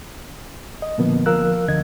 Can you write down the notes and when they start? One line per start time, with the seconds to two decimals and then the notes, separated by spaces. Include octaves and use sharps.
0.82 D#5
0.98 A#2 D3 F3 A#3 B3
1.26 F3 A#4 F5 E6 F#6
1.68 D2 D3 D#5 G#6